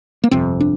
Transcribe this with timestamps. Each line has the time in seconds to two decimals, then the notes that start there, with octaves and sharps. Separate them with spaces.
0.24 A#3
0.31 G1 F2 C3 C4
0.60 D4